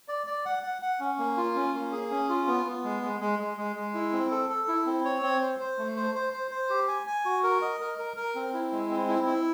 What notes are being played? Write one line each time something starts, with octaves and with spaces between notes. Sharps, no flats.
D5
D5
F#5
F#5
F#5
C#4
A#3
F4
C#4
A#3
G#4
C#4
F4
B3
B3
G#3
G#3
G#3
G#3
G#3
G#3
E4
C4
A4
A4
E4
C4
C#5
C4
C5
C5
A3
C5
C5
C5
C5
G4
G#5
G#5
F#4
A#4
D#5
A#4
A#4
A#4
C4
E4
G#3
C4
E4
E4